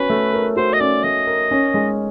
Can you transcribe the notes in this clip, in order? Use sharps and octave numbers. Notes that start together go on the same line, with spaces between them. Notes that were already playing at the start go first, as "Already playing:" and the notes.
Already playing: C#4 F#4 B4
A3
A#4
F#4 C5
D#5
C#4 D5
A3 D#5
A#4
C#4
G#3